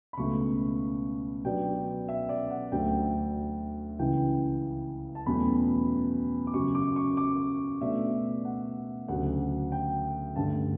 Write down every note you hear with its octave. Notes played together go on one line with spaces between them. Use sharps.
B5
C#2 B2 A3 C#4 C#6
B2 F#3 B3 D4 G5
E5
D5
F#5
D2 D3 F#3 A3 D4 G5
C#2 C#3 E3 G5
A5
E2 B2 F#3 A3 C#4 B5
D6
F#2 C#3 F#3 C#4 C#6
D6
C#6
D6
B2 A3 D4 E5
F#5
D2 C#3 F#3 F#5
G5
G2 D3 A3 A5